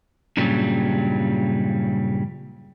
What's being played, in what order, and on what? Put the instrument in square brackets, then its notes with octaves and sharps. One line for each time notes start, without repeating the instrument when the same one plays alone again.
[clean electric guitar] G2 A#2 C#3 F#3 G3